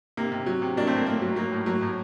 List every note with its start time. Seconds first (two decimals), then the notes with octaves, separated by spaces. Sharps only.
0.17 C3 A#3
0.32 C3
0.46 F#3
0.62 C3
0.77 F#3 A#3 D4
0.87 A3 C4
0.92 A2 A#3
1.06 A2 A#3
1.22 F#3
1.36 F#3 A#3
1.52 A2
1.66 F#3 A#3
1.81 A2